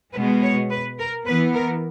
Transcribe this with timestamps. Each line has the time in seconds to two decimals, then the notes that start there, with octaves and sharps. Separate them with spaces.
0.13 B2 G#3 B3 B4
0.42 C#5
0.70 B4
0.99 A#4
1.26 E3 B3 B4
1.54 A#4